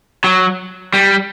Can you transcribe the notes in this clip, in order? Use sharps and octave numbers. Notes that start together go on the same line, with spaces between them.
F#3
G3